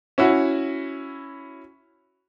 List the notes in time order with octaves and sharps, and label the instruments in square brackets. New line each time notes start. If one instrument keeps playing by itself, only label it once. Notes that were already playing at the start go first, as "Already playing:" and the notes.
[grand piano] C#4 E4 F#4